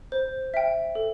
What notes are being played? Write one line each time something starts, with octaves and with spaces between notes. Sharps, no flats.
C5
E5 G5
A4